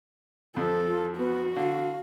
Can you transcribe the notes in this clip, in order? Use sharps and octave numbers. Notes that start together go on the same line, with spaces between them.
F2 F3 A4
F4
B3 F#4
D3 F5